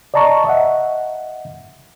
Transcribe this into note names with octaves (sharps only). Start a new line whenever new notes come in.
D5 D#5 A5 A#5 C#6
D#5 E5 F#5